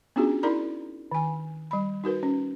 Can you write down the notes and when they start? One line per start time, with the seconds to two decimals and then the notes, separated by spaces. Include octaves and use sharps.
0.16 B3 C#4 D4 F4 F#4 G#4
0.43 D#4 E4 A#4 D5 A#5 B5
1.12 D#3 G#5
1.71 G3 B5
2.04 D#4 F#4 A#4 B4
2.23 C#4